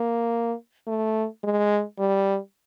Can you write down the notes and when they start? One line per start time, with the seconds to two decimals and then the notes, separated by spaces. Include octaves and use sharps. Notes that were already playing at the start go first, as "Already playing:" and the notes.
Already playing: A#3
0.87 A3
1.44 G#3
1.99 G3